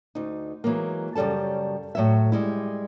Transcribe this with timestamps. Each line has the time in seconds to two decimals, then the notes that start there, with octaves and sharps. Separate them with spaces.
0.15 D2 D#4
0.64 E3 F#3 G#3 A#3
1.15 F#2 C#3 G3 A4 A5
1.95 A2 F#3 E5
2.32 G3 G#3 E4